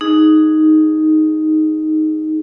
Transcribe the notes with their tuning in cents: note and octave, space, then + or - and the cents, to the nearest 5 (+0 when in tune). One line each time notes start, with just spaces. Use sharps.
D#4 +0 G#4 +0